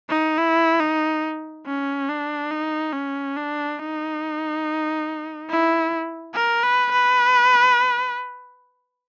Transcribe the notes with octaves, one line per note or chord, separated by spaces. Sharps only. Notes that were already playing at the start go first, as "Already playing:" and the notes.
D#4
E4
D#4
C#4
D4
D#4
C#4
D4
D#4
E4
A#4
B4
B4